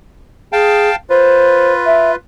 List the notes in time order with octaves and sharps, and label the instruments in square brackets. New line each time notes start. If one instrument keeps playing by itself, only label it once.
[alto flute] G#4 [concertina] F5 G5 A5
[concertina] F4 B4 [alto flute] C5
[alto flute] E5